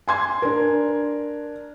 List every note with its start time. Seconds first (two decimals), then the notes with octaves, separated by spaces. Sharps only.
0.08 G#5 C6 G#6
0.42 D4 A#4